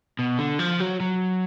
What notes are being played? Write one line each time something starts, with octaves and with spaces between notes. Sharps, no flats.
B2
D3
F3
F#3
F#3